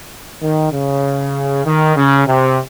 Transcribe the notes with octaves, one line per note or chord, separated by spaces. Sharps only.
D#3
C#3
D#3
C#3
C3